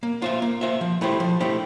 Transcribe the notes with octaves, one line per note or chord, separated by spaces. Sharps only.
A#3
F4 C5 E5
A#3
F4 C5 E5
F3
A3 E4 G4 C5
F3
A3 E4 G4 C5